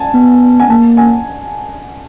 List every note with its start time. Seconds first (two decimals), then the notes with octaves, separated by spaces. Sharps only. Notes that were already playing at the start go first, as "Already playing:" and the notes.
Already playing: G#5 A5
0.14 B3
0.60 G#5
0.69 A#3 A5
0.97 G#5